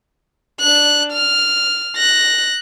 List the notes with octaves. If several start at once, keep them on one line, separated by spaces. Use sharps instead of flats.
D4 F#6
F6
F#6 A#6